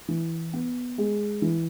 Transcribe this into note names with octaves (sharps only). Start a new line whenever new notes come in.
E3
B3
G#3
E3